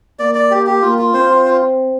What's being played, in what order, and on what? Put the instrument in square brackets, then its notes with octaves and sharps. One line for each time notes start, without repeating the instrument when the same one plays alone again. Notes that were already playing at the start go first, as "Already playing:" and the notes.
[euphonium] A#3 [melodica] D5
[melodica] D5
G4
G4
[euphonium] A#3 [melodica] F4
[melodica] F4
[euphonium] C4 [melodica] C5
[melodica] F4
F4